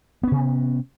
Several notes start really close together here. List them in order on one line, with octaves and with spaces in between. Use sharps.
B3 C#4 C3